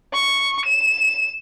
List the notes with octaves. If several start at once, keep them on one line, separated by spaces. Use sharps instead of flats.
C#6
E7